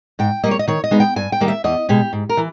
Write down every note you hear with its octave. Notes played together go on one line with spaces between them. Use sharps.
G#2 G5
G3 A#3 D#5
C#5
D#5
D#3 C#5
D#5
G#3 B3 D#4
G5
G2 G#5
G5
D#3 G3 A#3
E5
E2 D#5
B2 G#3 G4
G#2
A#4
E3